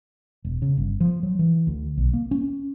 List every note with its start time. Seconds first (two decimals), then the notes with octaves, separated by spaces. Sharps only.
0.45 E1
0.62 C#3
0.77 G1
1.00 F3
1.23 F#3
1.39 E3
1.67 D2
1.97 B1
2.13 A#3
2.31 C#4